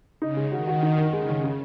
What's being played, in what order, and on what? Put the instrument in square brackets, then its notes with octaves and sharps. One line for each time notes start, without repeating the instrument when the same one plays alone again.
[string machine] C#3 [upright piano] D#4
[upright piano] G#3
[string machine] D#3 [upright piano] F#4
[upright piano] F#4
D#4
D#3
[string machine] C#3 [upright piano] G#3
[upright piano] D#3
C#3